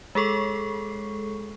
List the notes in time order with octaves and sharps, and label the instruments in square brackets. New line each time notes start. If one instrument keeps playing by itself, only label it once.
[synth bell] G#3 G#4 A4 C#6 C7